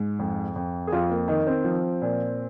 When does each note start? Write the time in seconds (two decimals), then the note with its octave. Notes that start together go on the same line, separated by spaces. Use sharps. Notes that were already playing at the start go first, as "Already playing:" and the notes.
Already playing: G#2
0.19 F2
0.56 F2
0.87 G#4
0.92 F2 F4
1.10 A#3
1.28 D#3 D#4
1.47 C4
1.64 F3
2.02 A#2